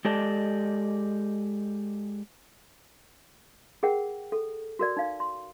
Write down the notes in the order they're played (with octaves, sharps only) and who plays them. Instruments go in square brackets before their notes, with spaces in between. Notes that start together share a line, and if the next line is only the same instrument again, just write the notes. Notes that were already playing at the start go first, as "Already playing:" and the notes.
[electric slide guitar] G#3 G4 A4 D5 D#5 A5
[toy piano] G#4 A#4 F#5 G5
A4
F#4 A#4 D5
D#4 F5
C6